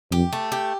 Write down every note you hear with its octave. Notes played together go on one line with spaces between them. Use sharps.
F2 G4
A3
G4